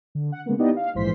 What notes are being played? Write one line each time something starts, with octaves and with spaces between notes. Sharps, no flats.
D3
F#5
C#3 G#3 A#3 B3
B3 D#4 E4 G4 D5 D#5
F5
A#1 G#2 E3 C5 C6 B6